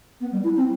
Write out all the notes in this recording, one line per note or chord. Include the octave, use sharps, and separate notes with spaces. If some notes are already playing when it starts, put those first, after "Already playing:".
B3
G3
E4
C4